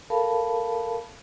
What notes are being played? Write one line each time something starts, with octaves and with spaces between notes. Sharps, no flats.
A4 A#4 F5 A5 B5